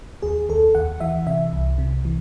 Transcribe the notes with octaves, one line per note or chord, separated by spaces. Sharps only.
D#2 G#4
D#2 A4
D#2 F#5
E3 E5
C3 E5
C2
C3
E3